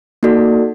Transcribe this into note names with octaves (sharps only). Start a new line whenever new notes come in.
A#3 D#4 F#4 A4 D5